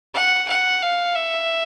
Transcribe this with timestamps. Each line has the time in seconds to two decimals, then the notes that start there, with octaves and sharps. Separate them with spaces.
0.14 F#5
0.48 F#5
0.82 F5
1.15 E5